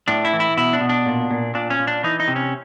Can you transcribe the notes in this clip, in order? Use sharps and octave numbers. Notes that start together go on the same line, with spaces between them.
A2 D4
E4
E3
E4
B2 E4
D4
B2
D4
A#2
A#2
A#2 D4
C#4
A#2
D4
E3 D#4
D#4
C3
C#4